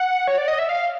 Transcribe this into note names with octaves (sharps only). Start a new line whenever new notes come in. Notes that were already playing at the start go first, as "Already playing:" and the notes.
Already playing: F#5
C#5
D5
D#5
E5
F5